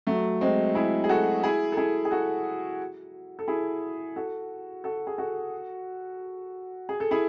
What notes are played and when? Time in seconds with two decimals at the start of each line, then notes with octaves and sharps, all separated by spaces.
0.07 F#3 A3
0.41 G#3 C4
0.75 E4 G#4
1.04 G#4
1.09 F#4 A4
1.44 E4 G#4
1.72 A4
1.77 E4 G#4
2.05 G#4
2.11 F#4 A4
3.39 A4
3.48 E4 G#4
4.16 F#4 A4
4.84 F#4 A4
5.07 G#4
5.18 F#4 A4
6.89 G#4
7.00 A4
7.11 E4 G#4